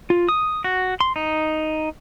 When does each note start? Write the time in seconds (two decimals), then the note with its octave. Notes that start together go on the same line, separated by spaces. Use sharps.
0.10 F4
0.29 D#6
0.64 F#4
1.00 C6
1.16 D#4